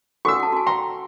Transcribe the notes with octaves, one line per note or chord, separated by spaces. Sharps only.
F#4 A4 F#5 C#6 E6
F#5 A5
F#4 G#5
G5 A#5 C6